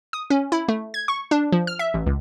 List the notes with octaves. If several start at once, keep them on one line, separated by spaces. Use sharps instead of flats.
D#6
C#4
E4
A3
G#6
C#6
D4
F3
F6
E5
A1
C#2